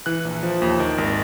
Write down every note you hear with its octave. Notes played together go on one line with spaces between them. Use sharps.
E3 F#6
A#1
F3
D#2
D#3
G#1